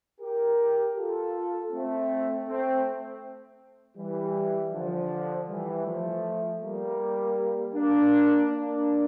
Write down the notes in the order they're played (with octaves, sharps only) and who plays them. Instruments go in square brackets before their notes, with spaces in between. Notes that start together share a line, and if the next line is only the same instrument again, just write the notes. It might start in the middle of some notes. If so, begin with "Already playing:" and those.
[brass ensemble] G4 A#4
F4 A4
A3 C4
A3 C4
E3 G3
D3 F3
E3 G3
F3 A3
G3 A#3
A#3 D4
A#3 D4